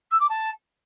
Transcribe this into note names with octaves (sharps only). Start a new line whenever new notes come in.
E6
D6
A5